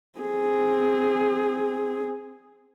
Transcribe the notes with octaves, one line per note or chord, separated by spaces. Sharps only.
C4 G#4